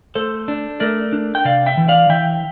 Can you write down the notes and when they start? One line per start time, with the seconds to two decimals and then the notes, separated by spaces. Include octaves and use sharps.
0.15 A3 A4 C5
0.48 D4
0.80 A3 A#4 D5
1.13 D4
1.35 G5
1.45 C3 D5 F5
1.66 E5 G5
1.77 E3
1.88 D5 F5
2.09 E3 E5 G5